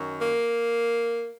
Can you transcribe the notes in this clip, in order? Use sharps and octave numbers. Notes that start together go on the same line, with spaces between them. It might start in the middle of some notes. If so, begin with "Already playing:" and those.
Already playing: F#2 D#3 F#3
A#3